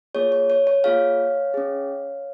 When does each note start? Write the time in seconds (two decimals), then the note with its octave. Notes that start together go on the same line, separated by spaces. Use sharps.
0.15 A#3 F4 G#4 C#5
0.32 C#5
0.50 C#5
0.67 C#5
0.84 A#3 F4 G#4 C#5 F5
1.54 C#4 G#4